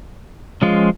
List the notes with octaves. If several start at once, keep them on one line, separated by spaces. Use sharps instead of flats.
F3 G#3 C#4 F4